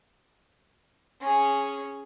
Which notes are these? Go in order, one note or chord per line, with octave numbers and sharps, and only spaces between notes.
C#4 G#4